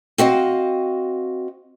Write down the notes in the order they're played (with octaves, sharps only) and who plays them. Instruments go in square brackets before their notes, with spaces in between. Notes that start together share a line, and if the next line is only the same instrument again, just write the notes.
[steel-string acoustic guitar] C4 F#4 D#5 F5